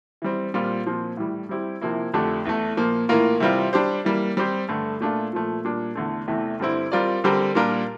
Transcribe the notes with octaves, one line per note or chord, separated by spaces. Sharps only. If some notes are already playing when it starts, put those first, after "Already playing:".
E3 G3 C4
A#2 G3 C4 F4
A#2 F3 C4
A2 E3 G3
G3 C4 E4 G4
C3 F3 A#3 E4
F2 D3 A3 D4 G4
E2 E3 A3
A#2 F3 A#3
A2 E3 A#3 F4 A#4
C3 E3 G3 C4 F4
G3 D4 G4 C5
E3 G3 A#3
G3 C4 G4 C5
G2 D3 A3
A#2 A3 D4 F4
A#2 F3 A3
A#2 G3 D4
E2 D3 A3
E2 C3 E3 A3
G2 D3 G3 C4 E4
G3 C4 F4 A#4 D5
D3 G3 C4 G4 A#4
A#2 G3 D4 F4 A#4